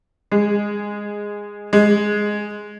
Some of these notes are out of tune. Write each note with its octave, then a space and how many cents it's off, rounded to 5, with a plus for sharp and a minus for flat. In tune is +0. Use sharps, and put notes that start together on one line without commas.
G#3 -10
G#3 +0